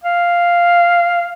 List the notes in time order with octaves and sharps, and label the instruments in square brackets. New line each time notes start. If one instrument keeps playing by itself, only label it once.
[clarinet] F5